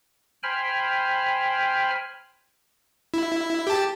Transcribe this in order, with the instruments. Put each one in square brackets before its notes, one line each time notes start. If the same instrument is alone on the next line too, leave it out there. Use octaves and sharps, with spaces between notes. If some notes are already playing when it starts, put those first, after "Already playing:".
[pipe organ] C5 G5 G#5 B5 F6
[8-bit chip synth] E4
G4 A5